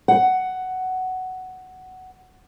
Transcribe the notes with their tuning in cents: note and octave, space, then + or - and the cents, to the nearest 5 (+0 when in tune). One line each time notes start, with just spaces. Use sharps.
F#5 +10